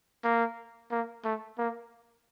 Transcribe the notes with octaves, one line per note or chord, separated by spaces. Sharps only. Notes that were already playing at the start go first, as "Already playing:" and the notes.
A#3
A#3
A3
A#3